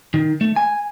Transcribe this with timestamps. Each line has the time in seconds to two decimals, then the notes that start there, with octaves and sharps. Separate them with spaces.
0.14 D#3
0.41 A3
0.56 G#5